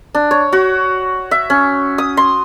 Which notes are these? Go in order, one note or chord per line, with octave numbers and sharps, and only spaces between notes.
D4
C#5
F#4
E5
C#4
D#6
C6